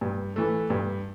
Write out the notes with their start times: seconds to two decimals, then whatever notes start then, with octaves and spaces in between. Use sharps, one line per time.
0.01 G2
0.36 E3 A3
0.70 G2